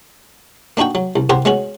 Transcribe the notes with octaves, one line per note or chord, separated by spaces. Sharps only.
A#3 D4 D#4 F#4 G5
F#3
C2
C2 G4 A#4 C5 F#5 C6
G#3 B3 C#4 F#4